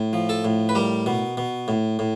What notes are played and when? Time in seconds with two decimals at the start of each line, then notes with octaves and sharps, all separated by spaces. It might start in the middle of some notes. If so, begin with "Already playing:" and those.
Already playing: A2
0.13 F3
0.29 A4
0.45 A2
0.69 B4
0.75 G3 A#4
1.06 B2
1.37 B2
1.68 A2
1.99 A2